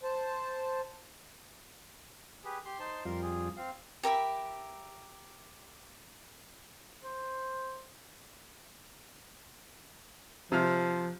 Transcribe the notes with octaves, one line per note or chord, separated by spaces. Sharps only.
C5 A5
G4 G#4 B4
G4 C6
D#4 C5 A5
F2 G3 F4 A#4 C6
G#4
C4 F5
G4 A#4 E5 B5
C5
C3 F3 F6